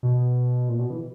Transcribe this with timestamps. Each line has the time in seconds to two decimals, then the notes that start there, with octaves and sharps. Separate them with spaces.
0.03 B2
0.69 A#2
0.79 B2
0.90 E3